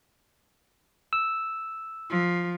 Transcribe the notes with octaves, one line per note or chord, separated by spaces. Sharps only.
E6
F3